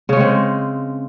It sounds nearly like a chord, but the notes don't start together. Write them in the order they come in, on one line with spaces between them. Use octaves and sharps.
C#3 C#4 G#3 C4